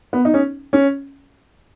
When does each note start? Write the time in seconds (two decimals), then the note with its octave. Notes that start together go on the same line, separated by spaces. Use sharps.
0.13 B3
0.25 D#4
0.34 C#4
0.73 C#4